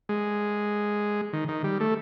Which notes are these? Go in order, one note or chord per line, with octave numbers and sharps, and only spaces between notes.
G#3
D#3
D#3
G3
A3